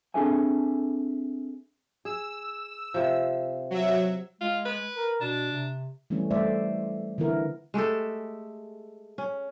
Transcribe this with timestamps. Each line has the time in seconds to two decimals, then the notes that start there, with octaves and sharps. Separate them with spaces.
0.14 C4 D4 G#4 A4 E5 G#5
2.05 G#4 E6
2.94 C3 F3
3.71 F#3 E5
4.41 G#3 F4
4.65 B4
4.96 A#4
5.21 B2 D4
5.51 C3
6.10 E3 G3 A3 B3 C#4
6.31 G3 A3 C5 D5 E5
7.18 D3 E3 B3 E4 A#4
7.74 G#3 A3 G4 A4
9.18 C#4